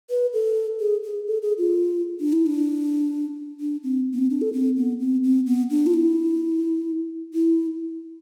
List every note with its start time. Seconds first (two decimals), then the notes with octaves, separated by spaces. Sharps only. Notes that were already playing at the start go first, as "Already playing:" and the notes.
0.10 B4
0.33 A4
0.80 G#4
1.03 G#4
1.27 A4
1.42 G#4
1.58 F4
2.20 D4
2.33 E4
2.46 D4
3.60 D4
3.83 C4
4.13 B3
4.19 C4
4.30 D4
4.42 A4
4.53 C4
4.77 B3
5.00 C4
5.24 C4
5.46 B3
5.70 D4
5.86 F4
5.94 E4
7.34 E4